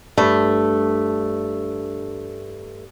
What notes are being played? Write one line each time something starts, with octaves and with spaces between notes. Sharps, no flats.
G2 A3